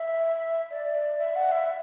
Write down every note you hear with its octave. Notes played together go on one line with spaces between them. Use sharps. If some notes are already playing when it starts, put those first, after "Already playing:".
Already playing: E5
D5
E5
F#5
E5